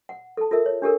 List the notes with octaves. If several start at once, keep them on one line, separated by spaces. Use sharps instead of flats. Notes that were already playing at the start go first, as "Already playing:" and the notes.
F#5
A4 A5
F4 A4 A#4 E5
C#5
D4 G4 A4 A#4